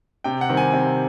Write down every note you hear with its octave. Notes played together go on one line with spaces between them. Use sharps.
C3 G5
F#5
D#3 G3 C4
G#5
C3